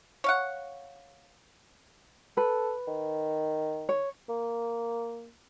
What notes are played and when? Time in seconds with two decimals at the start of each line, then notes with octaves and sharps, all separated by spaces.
0.24 C#5 F5 F#5
2.37 A4 B4
2.88 D#3
3.89 C#5
4.29 A#3